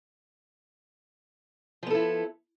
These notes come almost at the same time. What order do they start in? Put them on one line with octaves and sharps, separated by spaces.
F3 B3 A4 E4